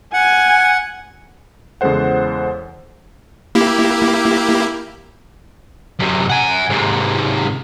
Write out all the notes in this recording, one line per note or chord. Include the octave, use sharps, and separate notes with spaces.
F#5 G#5
E2 C#3 G#3 A4 C5 F#5
A#3 E4 G4
F#2 C3
F#5 G#5
G#2 C3